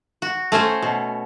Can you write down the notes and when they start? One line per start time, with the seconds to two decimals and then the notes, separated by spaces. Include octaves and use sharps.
0.22 F#4
0.52 A3 C#4 C5 C#5
0.82 B2